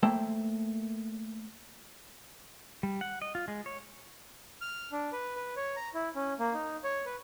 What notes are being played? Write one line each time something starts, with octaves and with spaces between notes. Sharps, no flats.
A3 A#3 C5 E5 G5
G3
F#5
D#5
F4
G#3
C#5
F6
D4
B4
B4
C#5
A#5
E4
C#4
A#3
D#4
C#5
B4